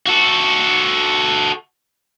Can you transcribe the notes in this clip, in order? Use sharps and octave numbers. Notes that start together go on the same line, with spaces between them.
F#4 A4